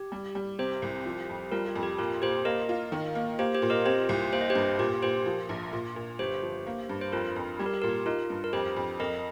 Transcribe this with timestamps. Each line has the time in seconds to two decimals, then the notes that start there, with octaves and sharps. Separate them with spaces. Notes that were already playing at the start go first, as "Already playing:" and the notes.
Already playing: G4
0.12 G3
0.35 G3
0.59 C3 G4 C5
0.82 C2
1.06 F3
1.29 F2
1.52 G3 F4 A#4
1.68 G4
1.76 F2
1.83 G4
1.98 A#2 F4 A#4
2.22 A#2 G4 C5
2.45 A#3 A#4 D#5
2.69 F4
2.92 D#3
3.15 A#3
3.39 A#3 G4 C5
3.55 G4 C5
3.62 A#2
3.70 A#4 D#5
3.86 C4 G4 C5
4.09 C2
4.32 A#3 C5
4.41 D#5
4.50 G4 C5
4.55 G2
4.79 A#2 G4
5.02 A#2 G4 C5
5.26 F3
5.49 A#1
5.73 A#2
5.96 A#2
6.19 G1 G4 C5
6.42 F3
6.66 A#3
6.89 G2
7.01 C5
7.12 F2 F4 A#4
7.36 F2
7.59 G3 G4
7.66 A#4
7.74 G4
7.82 A#2 A#4
7.89 G4
8.06 D#4 F4 A#4
8.30 G2
8.44 A#4
8.53 F2 G4 C5
8.76 F2
9.00 F2 A#4 D#5